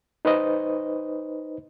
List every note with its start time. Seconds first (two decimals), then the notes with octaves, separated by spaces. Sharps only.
0.25 D#4 B4 C5 D#5